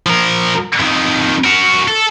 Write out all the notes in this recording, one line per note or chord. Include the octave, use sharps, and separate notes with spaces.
F3 A#4
F2 D#3
F#4 A#4
A4